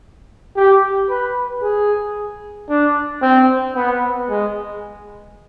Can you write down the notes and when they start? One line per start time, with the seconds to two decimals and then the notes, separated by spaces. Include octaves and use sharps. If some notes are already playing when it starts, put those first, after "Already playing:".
0.56 G4
1.09 B4
1.63 G#4
2.69 D4
3.22 C4
3.76 B3
4.30 G#3